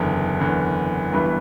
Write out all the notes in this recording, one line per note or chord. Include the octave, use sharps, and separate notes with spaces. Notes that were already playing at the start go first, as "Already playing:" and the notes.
Already playing: F#1 E2 D3
F#1 E2 D3
G1 G2 E3 B3